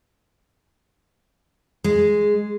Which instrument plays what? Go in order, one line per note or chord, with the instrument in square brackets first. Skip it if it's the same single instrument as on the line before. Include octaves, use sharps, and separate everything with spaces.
[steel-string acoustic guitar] G#3